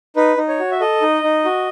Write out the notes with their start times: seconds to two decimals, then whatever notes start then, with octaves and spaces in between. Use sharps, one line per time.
0.16 D#4 B4
0.37 D#4
0.48 C#5
0.59 F#4
0.71 E5
0.80 A4 D#5
1.02 D#4
1.23 D#4
1.45 F#4